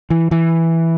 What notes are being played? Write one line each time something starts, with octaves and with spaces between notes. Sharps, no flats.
E3
E3